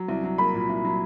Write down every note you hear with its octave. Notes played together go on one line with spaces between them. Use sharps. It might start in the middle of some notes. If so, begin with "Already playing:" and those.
Already playing: F#3
C2
F#3
A#3 B5
A#2
C2
F#3